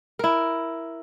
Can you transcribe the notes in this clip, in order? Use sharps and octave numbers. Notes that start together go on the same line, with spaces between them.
E4 A#4